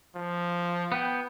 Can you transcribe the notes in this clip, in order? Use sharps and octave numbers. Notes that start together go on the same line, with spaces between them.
F3
B3 G5